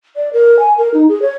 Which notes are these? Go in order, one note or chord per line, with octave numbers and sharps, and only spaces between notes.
D5
A#4
G#5
A#4
D#4
G#4
C#5